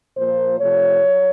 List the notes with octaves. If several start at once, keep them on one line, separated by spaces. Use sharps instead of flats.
A#2 F3 A#3 C5
C3 F3 A3 C#5
F#3